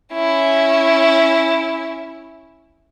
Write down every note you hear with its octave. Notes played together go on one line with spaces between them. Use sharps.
C#4 E4